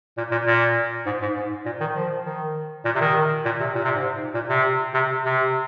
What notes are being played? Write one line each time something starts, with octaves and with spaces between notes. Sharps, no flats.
A#2
A#2
A#2
G#2
G#2
G#2
A#2
D#3
F3
D#3
A#2
C3
D#3
A#2
C3
A#2
C3
G#2
A#2
C3
C3
C3